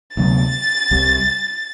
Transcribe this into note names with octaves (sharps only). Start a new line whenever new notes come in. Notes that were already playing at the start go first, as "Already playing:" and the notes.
D2 C3 F#3 B3 A6
C2 C3 G3